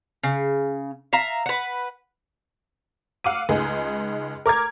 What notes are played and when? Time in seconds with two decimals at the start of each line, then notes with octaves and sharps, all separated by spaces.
0.23 C#3
1.13 E5 F5 A#5
1.46 B4 F#5
3.24 F5 F#5 D6 E6 D#7
3.49 C#2 G#3 D#4 G#4
4.46 A#4 D6 F6 G#6